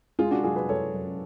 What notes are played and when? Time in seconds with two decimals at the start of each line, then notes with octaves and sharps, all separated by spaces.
0.19 G#3 F4 G#4
0.31 D4 F#4
0.44 F#2 F4 G#4
0.56 G#4 B4
0.68 F#2 A4 C#5
0.94 F#2